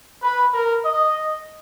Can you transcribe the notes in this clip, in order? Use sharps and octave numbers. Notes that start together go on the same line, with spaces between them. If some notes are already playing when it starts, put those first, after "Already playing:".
B4
A#4
D#5